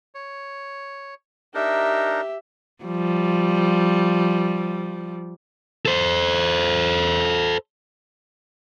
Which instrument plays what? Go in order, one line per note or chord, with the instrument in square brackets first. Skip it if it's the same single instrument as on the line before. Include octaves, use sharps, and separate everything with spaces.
[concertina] C#5
[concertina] D4 D#4 A#4 [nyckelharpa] G4 E5
[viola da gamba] F3 G3
[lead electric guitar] A4 C5